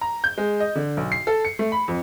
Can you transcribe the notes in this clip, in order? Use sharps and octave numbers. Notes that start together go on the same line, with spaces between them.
A#5
G6
G#3
D#5
D3
B1
C7
A4
C#7
A3
B5
F2